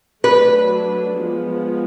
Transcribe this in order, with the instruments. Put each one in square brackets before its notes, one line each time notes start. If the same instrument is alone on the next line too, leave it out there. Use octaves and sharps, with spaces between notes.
[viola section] F#3 A3 D4 [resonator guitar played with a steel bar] B4
[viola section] F3 G#3 B3